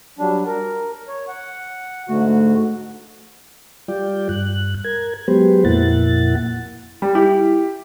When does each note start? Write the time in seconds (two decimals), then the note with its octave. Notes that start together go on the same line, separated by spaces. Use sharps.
0.19 F#3 G3 D4
0.46 A#4
1.08 C#5
1.28 F#5
2.09 G#2 D3 A3 F#4
3.88 G3 F4 D5 G5
4.29 G2 F#6
4.84 A#4 G#6
5.28 F#3 G#3 B3 G4 B4 C5
5.65 F2 A#2 A#3 E4 F#5 A6
7.02 G3
7.15 E4 G4